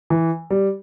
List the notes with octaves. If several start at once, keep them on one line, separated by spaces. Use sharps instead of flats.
E3
G3